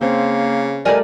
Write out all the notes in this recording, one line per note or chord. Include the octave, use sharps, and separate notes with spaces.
C#3 A#3 C4
G3 A3 A#4 D5 D#5 G#5